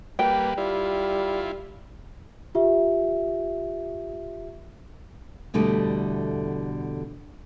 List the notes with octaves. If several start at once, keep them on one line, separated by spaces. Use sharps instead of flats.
G3 A#3 B4 G5
G3 E4 F4
F4 G4 E5
E2 B2 D3 G3 A3